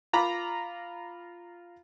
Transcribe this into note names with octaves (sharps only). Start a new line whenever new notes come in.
F4 A#5 B5 D6